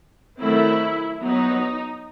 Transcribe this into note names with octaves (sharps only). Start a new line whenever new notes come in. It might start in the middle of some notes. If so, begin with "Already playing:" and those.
D#3 F#3 A3 C4 E4
F#3 B3 D#4